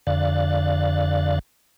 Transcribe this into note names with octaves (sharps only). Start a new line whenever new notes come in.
F2 D3 D5 F5 F#6 A6